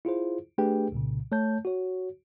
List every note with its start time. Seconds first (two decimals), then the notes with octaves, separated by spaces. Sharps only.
0.05 E4 F4 G#4 C5
0.58 A3 D4 G4 G#4 B4 G5
0.92 C2 A#2 C#3
1.32 A3 C#5 A5 G6
1.65 F#4 C#5